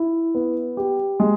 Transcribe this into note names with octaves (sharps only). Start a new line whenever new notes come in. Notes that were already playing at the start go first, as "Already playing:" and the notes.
Already playing: E4
B3
G4
G#3